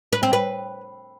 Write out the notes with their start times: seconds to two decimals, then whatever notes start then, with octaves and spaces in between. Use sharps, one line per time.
0.13 B4
0.23 C4
0.33 B4